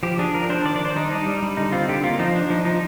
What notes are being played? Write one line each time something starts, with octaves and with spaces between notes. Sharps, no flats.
F3 G4
D4 G#4
F3 A#4
D4 C5
D#3 D5
D5
D4 C5
G3 D#4
D4 D#4
G3
G3
D3 D#4
C4 F4
D3 G4
A#3 F4
F3 D#4
D4
F3 D#4
F3 D#4